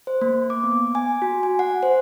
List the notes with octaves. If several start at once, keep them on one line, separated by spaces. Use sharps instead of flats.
C5
A#3
D6
B3
G#5
F#4
G#5
F#5
C5